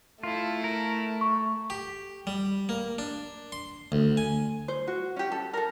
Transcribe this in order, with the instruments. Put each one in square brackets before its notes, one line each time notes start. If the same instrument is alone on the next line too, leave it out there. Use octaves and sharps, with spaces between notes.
[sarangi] A3 [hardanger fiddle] E4 A4 [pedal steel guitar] F4
[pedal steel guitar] A#4
[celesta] C#6
[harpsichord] G4
G3
A#3
D4
C6
D2
G#5
[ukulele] C5
F#4
C#4 G4
A4
A4 A#4